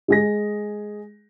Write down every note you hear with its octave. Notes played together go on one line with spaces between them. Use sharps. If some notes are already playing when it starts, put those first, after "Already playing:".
G#3 G#4 A#6